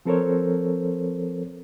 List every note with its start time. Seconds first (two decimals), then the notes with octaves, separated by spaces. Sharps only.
0.05 F3 C4 A4 A#4 C5 C#5